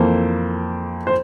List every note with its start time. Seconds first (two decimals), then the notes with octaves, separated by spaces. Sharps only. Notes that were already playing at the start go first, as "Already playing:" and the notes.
Already playing: F2 E3 A#3 A4 C5
1.07 C5